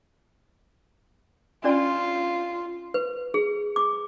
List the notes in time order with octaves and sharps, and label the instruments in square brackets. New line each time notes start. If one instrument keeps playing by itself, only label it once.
[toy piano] C#4 D4 D5 [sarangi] F4
[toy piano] B4
G#4
D6